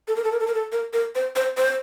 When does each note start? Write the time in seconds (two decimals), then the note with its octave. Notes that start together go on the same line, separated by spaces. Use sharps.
0.08 A4
0.16 A#4
0.24 A4
0.32 A#4
0.40 A4
0.47 A#4
0.54 A4
0.72 A#4
0.93 A#4
1.15 C5
1.36 C5
1.57 C5